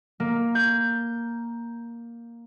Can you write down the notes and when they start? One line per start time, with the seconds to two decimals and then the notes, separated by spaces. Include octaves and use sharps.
0.20 A#3
0.55 G6